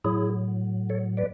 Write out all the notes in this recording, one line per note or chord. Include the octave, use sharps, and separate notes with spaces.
A2 F#3 E4 G#4
A4 C#5
B4 D5